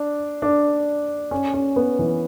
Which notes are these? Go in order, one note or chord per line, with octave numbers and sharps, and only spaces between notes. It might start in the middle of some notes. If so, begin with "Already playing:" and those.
Already playing: D4
D4
C#4
C#4
B3
E3